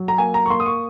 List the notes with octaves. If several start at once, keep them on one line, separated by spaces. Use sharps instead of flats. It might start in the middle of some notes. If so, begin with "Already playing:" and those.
Already playing: F#3
A#5
A#3 G#5
A#5
C#6
A#3 C6
D#6
C#6